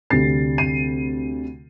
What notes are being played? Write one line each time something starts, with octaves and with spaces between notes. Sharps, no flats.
D2 C3 G3 A6 C7
C7 D#7